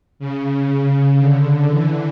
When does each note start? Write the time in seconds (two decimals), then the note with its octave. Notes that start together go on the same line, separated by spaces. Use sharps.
0.19 C#3
1.19 D3
1.70 E3